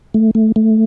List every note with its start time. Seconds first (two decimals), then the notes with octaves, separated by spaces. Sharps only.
0.14 A3
0.35 A3
0.56 A3